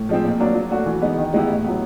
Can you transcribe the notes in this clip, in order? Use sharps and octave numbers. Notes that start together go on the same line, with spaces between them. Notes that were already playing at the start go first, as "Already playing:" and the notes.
Already playing: A2
F3 G#3 C4
A#2
F#3 A#3 D4
F#3
A3 D4 F#4
E3
G#3 B3 D#4
D#3
G#3 B3 E4 G4
A2
F#3 B3